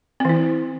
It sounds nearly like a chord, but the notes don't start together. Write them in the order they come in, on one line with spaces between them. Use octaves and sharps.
C4 E3 E4